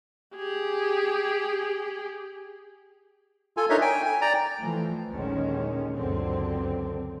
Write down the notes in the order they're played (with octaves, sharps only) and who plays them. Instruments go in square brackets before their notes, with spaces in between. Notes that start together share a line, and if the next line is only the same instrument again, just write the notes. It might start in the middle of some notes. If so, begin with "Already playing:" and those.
[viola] G4 G#4
[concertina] F4 A4 G#5
D4 D#4 A4 A#4 C#5 E5
G5 G#5
G#5
D5 G5 A#5
[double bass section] E3 F3 A3
A#1 D#2 D3 D#3 G#3 C#4
C#2 F#2 D3 C4